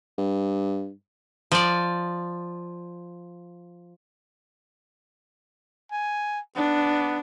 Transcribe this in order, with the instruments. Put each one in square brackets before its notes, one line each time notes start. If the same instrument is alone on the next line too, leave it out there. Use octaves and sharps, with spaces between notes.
[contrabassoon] G2
[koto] F3 D5
[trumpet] G#5
[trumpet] B3 [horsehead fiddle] D4